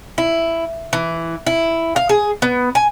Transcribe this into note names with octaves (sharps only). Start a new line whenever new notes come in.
E4
E3
E4
F5
G#4
B3
G#5